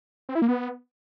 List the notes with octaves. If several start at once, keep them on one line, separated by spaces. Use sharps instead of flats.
C4
E4
A#3
B3